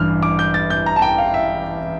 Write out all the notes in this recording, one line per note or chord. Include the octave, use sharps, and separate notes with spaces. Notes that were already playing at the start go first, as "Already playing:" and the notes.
Already playing: A1 G2 E3 F6
D6
G6
A6
G6
A#5
A5
G5
F5
E5